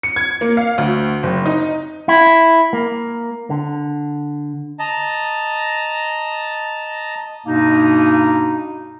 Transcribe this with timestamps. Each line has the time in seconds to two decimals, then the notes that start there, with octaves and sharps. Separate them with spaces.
0.03 C#7
0.16 G#6
0.41 A#3
0.57 F5
0.78 D2
1.23 F#1
1.46 D#4
2.08 E4
2.73 A#3
3.50 D3
4.79 D#5 A5 A#5
7.46 G2 B2 A#3 D#4